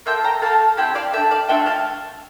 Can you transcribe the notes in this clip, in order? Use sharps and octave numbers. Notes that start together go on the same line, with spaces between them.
A#3 F4 A4 E5 G5
G5 A#5
A3 D4 A4 F5 A5
C4 E4 G4 E5 G5
D5 F5
D4 A4 E5 G5
D5 F5
A3 D4 F4 E5 G5
F5 A5